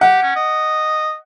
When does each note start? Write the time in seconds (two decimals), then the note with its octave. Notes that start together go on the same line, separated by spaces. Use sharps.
0.01 G4 F#5
0.22 C#4
0.36 D#5